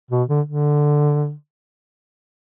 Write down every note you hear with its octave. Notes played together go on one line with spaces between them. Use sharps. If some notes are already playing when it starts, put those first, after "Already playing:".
B2
D3
D3